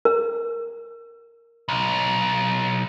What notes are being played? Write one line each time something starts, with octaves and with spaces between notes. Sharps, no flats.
A#4
B1